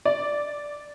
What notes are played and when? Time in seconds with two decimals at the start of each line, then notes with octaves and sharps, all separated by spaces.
0.05 D5